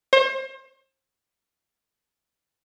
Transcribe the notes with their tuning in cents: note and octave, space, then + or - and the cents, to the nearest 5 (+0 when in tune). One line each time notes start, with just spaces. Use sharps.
C5 +35